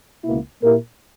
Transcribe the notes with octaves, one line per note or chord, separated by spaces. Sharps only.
C#2 B2 A#3 E4
A#2 A#3 E4 G4 A#4